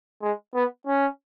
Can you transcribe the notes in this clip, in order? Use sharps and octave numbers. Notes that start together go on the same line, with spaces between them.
G#3
B3
C#4